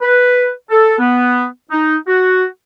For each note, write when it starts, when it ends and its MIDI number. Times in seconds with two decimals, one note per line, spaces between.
0.02 0.50 71
0.71 0.96 69
0.99 1.45 59
1.71 1.96 63
2.07 2.44 66